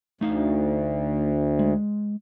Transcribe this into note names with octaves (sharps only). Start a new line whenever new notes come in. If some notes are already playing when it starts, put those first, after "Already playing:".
D2 A3 D#4 F5
G#3